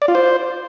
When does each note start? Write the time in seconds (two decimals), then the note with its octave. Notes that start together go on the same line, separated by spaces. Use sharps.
0.02 D5
0.08 F4
0.15 C5